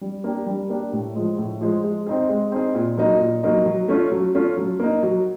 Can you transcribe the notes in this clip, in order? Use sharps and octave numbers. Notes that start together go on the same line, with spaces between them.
G3
A#3 D4 G4
G3
A#3 D4 G4
A2
F3 G#3
A2
F3 G#3
G#3
C4 D#4 G#4
G#3
C4 D#4 G#4
A#2
F#3 A#3 D#4
A#2
F#3 A#3 D#4
F#3
A3 C#4 F4
F#3
A3 C#4 F4
F#3
A#3 D#4
F#3